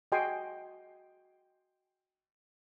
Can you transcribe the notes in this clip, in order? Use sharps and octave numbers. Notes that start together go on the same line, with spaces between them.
F#4 G#4 D#5 G5 G#5 C6